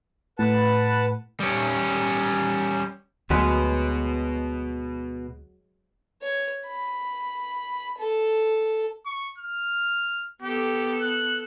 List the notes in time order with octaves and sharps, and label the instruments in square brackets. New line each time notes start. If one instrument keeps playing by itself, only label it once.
[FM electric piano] A2 [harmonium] B4 F#5 A5
[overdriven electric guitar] G3 C#4
[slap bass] D2 [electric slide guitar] B2 B3 [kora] F#3 G#3 B4
[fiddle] C#5
B5
A4
[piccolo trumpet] C#6
F6
[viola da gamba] B3 A4 [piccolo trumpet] G4
[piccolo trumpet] F#6